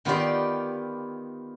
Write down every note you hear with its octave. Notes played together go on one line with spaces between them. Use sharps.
D#3 B3 F4 G4 D5 F5